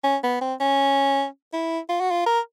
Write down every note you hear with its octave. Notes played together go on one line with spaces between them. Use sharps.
C#4
B3
C4
C#4
E4
F4
F#4
F4
A#4